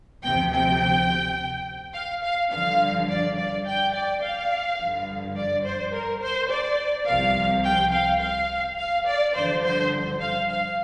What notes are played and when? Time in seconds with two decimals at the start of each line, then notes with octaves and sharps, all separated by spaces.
0.23 D2 C3 F3 G5
0.53 G5
1.94 F5
2.23 F5
2.51 G2 D3 F3 F5
3.09 D5
3.37 D5
3.66 G5
3.94 D5
4.22 F5
4.79 G2 D3 F3
5.36 D5
5.65 C5
5.93 A#4
6.22 C5
6.50 D5
7.07 C2 C3 F3 F5
7.64 G5
7.92 F5
8.21 F5
8.78 F5
9.06 D5
9.35 G2 D3 F3 C5
9.64 C5
10.21 F5
10.50 F5